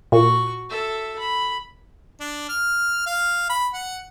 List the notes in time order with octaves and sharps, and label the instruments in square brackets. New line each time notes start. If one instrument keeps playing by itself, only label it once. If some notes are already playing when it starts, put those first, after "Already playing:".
[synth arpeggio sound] A#2 [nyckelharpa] F#4 C#6
[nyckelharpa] A4 E5
B5
[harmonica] D4
F6
F5
B5
F#5